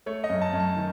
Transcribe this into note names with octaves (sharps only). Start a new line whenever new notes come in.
A3 C#5
D#5
F#2
A5
F#2
A5
D#3